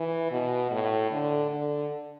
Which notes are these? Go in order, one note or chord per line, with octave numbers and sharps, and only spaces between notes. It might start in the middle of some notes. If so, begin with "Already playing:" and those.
Already playing: E3
B2
A2
D3
D3